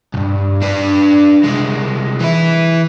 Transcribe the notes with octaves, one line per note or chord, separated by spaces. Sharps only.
B1 G2
D4 B4
C2 G#3
E3 E4